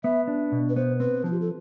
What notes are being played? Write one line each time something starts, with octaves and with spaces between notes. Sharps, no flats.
B3 E5
D4
B2
B4
B3 C5
C4 B4
F3 F4
G4
A4